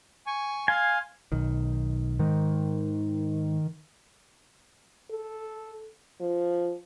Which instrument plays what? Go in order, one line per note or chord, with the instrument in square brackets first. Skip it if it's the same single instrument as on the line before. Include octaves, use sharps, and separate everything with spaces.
[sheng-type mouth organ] G#5 C#6
[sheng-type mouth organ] F5 C6 [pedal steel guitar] G#5
[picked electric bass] B1 D#3
[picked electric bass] G#2 [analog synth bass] D#3
[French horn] A4
F3